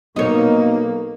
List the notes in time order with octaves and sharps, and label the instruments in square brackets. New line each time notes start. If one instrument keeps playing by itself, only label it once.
[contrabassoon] B1 [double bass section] B2 A#3 [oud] D#4 C#5